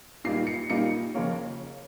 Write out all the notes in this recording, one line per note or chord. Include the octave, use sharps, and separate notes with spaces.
A#2 G3 A#3 D#4 C7
C#7
A#2 G3 A#3 D#4 C#7
F2 C#3 F3 A#3 C#4